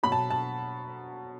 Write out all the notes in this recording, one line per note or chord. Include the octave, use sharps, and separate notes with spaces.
B2 F#3 B5
A5
A5